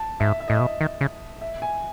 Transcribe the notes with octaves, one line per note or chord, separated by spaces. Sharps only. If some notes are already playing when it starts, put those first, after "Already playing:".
Already playing: A5
G#2 E5
E5
A2 D#5
B2 E5
D#3
C#3
E5
G#5